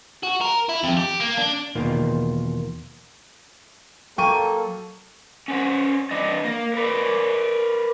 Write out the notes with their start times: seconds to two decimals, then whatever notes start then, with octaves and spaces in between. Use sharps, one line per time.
0.23 F#4
0.41 A#4
0.69 E4
0.84 F2
0.97 G4
1.20 A#3
1.37 D4
1.75 E2 B2 D#3 A#3 F4
4.18 F#3 A#3 A4 G5 C#6 D#7
5.48 C#4 D4 C5 F#5
6.11 E3 D4 B4 D#5
6.44 A#3
6.74 A#4 B4 D5